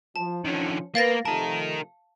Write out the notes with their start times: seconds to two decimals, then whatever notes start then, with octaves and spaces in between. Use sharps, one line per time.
0.16 F3 A5
0.45 D3 D#3 F3 C#4
0.95 A#3 B3 A#4 B4 F5 A6 A#6
1.25 C3 F3 A3 D#4 A#4 A5